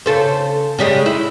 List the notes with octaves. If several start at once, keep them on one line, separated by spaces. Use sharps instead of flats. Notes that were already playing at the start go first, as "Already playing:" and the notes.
C#3 A4 C5
C#3 G3 G#3
E4